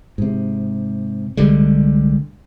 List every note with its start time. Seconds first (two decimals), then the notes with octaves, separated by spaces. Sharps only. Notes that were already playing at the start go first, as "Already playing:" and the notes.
0.18 G#2 C3
1.37 C2 D3 G3 G#3